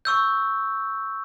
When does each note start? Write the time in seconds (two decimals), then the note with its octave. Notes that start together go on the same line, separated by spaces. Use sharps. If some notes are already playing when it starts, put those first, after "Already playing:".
0.05 C#6 E6 G6